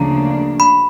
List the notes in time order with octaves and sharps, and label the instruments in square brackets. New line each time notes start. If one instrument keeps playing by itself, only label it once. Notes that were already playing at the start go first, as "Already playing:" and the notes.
Already playing: [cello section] D2 C#3 F3 A#3 D4 [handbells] A#5
[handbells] B5